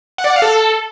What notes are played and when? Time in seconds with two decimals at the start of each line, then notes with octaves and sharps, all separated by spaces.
0.18 F#5
0.24 D5
0.30 F#5
0.36 F5
0.42 A4